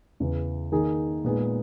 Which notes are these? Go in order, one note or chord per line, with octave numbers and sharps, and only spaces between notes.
E2 C#3 E3
D#3 A#3 D#4 G#4
A#2 G#3 B3 D#4 G#4